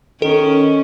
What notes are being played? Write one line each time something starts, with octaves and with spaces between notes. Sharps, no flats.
D#3 C#4 A4